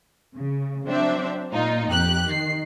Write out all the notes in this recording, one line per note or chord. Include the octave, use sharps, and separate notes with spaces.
C#3
F#3 C4 D4 C5 E5
A#2 D#4 F4
F2 G4 F#6
D#3 C7